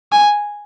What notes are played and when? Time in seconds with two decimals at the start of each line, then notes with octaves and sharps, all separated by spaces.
0.12 G#5